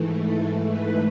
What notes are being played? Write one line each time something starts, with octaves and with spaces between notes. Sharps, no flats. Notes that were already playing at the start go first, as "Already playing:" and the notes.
Already playing: G#2 E3 A3
A4
B4